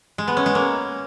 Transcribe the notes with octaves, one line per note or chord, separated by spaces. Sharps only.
G#3
B3
C#4
G#3
A#3